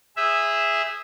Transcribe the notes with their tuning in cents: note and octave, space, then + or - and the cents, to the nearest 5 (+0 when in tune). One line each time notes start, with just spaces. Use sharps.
G#4 -15 C5 -30 E5 +0